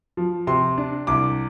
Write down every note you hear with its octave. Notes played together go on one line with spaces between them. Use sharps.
F3
C3 C6
D4
C2 D6